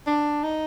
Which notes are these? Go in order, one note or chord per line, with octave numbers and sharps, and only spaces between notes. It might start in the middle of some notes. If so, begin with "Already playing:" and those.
D4
D#4